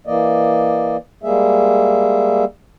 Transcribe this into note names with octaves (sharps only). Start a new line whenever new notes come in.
E3 A#3 D5 D#5
G3 G#3 A#3 G#4 E5